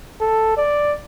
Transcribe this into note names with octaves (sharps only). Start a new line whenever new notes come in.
A4
D5